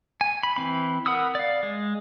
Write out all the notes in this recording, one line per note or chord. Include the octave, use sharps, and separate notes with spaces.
G#5
B5
E3 C4 B5
A#4 F#5 B5 D#6 E6
D5 F5
G#3